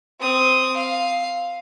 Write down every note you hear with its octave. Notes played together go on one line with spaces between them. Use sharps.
C4 D#6
F5